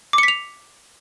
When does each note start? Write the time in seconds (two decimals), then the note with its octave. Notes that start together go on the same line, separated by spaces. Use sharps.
0.13 D6
0.18 C#7
0.23 B6
0.28 F7